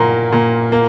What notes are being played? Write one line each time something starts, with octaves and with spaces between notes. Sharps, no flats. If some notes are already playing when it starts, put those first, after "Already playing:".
Already playing: A#2 A#3 A#5 C6
A#2
A#3